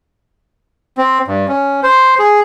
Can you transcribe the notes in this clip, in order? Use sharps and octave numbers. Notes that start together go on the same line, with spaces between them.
C4
G2
C#4
C5
G#4